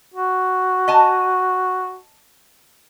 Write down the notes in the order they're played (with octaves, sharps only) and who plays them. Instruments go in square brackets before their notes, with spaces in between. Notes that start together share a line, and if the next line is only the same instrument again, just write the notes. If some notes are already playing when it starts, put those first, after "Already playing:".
[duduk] F#4
[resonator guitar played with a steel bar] D#5 G#5 A5